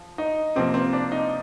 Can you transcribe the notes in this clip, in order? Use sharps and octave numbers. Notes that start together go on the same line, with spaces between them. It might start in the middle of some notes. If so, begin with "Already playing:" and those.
Already playing: F3
D#4
C3 F3 A#3 C4
C4
D4
D#4